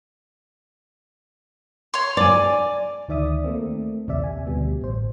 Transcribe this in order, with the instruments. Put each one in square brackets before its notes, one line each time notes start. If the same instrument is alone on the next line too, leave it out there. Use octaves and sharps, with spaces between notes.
[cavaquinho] C#5 C6
[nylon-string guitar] D5 G#5 [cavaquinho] D6
[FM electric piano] D2 D#3 D5 E5 D#6
A3 A#3 C4
A#1 D#2 C3 D5 E5
G#5
D2 B2 G3 B3
A1 C5